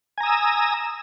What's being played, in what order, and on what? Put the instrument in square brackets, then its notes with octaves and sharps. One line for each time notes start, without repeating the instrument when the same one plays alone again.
[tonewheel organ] G#5
A#5
D#6
E6